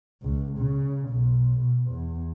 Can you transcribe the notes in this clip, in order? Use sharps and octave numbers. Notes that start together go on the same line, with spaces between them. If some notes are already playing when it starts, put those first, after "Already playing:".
C#2
C#3
B1
B2
E2